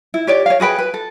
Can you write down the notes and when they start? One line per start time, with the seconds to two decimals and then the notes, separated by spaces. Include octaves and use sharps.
0.14 E4
0.27 G4 C#5 D5
0.46 C#5 F5
0.60 F#4 G#4 B4 G5
0.79 B4
0.94 A4